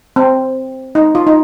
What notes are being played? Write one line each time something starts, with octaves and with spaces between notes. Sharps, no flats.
C4
D#4
F4
D#4